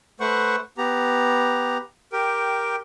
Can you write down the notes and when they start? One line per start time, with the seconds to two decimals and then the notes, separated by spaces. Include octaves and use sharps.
0.20 A3 B4 C5 F#5 C#6
0.78 B3 G4 A#5
2.13 G4 A#4 G5